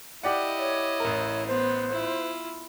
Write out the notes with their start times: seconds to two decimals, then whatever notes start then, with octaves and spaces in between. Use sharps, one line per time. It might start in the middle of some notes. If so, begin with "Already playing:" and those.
0.23 E4 G4 D5 D#5 F#5
0.59 C#5
1.00 A1 A#4
1.47 B3 C5
1.92 E4 F4